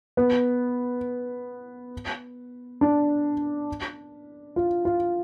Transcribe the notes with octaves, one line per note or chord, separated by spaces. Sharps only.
B3
D4
F4
F4